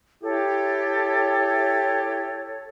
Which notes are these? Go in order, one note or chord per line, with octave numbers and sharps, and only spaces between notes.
E4 G4 A4 C#5